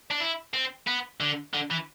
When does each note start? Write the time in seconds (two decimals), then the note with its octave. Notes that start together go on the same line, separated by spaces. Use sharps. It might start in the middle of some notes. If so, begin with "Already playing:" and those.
0.11 D4
0.20 E4
0.54 C4
0.87 B3
1.20 D3
1.54 D3
1.70 E3